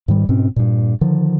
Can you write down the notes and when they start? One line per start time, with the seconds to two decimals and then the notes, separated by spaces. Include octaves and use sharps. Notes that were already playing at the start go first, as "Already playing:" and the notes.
0.08 G#2 D#3 G3
0.29 G#2 B2 C4 C#4
0.56 G2 A#2
1.01 D3 D#3 F3